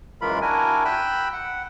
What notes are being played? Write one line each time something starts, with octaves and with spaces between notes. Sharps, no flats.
F#2 E3 G#3 F4 A#4 B5
D4 E4 F#4 A#4 G#5
G5 B5 E6 F#6
F#5